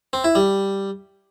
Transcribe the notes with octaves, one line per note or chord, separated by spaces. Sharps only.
C4
E4
G3